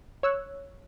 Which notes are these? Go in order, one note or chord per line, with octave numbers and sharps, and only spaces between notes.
C#5 E6 F#6